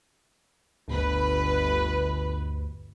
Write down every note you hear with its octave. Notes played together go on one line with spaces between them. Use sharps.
G1 D2 B4